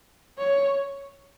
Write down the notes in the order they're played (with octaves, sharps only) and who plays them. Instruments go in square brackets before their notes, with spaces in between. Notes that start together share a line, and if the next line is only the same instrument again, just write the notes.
[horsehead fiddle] C#5